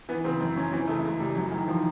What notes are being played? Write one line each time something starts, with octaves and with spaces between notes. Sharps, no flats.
E3 B3
C#3 C4
F#2 C4
F#2 C#4
E3 C4
C#3 A3
C#2
C#2 G3
F#2 F#3
D#3 E3
D#3 F3